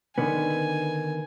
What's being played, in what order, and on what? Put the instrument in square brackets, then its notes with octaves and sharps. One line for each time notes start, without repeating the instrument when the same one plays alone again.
[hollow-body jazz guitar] D3 D#3 B3 [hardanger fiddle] G#5